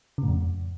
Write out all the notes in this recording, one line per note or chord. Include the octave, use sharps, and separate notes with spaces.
C#3
A2
F2